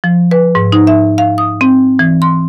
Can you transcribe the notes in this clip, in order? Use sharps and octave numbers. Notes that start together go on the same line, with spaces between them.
F3
B4
G#2
D#4
E5
F5
D#6
C4
E3
C6